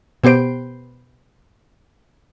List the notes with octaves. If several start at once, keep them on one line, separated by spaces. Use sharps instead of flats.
B2 B3 G4 C5 D7